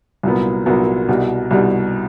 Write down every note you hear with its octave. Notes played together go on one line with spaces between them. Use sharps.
C2 A#2 F#3 B3
C2 A#2 F#3 B3
C2 B2 G3
C2 B2 G3